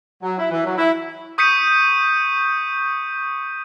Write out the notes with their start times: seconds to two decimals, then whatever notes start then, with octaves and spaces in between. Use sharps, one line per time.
0.23 F#3
0.37 E4
0.50 E3
0.64 F#3
0.76 E4
1.38 C#6 D#6 G6 B6 C#7 D#7